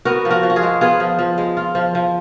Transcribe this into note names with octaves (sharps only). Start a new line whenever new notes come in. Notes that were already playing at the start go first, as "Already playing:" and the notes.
B3 F#4 A#4
F3
F#4 A#4
F3
F#4
F4 G#4
G#3
B3 F4 G#4
F3
F3
G#3
F4
F3
F3